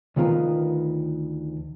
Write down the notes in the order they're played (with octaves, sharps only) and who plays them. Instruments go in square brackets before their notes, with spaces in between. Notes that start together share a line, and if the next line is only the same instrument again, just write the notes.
[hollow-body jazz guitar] D2 D#3 B3 F4 A#4 G#5